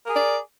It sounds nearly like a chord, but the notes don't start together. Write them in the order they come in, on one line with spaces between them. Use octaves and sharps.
A#4 G#4 D5